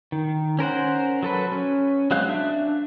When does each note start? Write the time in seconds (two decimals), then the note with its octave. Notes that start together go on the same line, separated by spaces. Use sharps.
0.12 D#3
0.59 C#4 A#4 C5 F#5
1.23 F#3 A4 B4
1.52 C#4
2.11 F#3 G#3 C4 F5 F#6
2.29 D4 E5